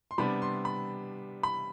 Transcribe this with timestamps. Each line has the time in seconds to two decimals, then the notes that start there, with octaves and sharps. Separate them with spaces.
0.11 C6
0.18 C3 G3 B3 D4 B5
0.42 C6
0.65 B5
1.43 B5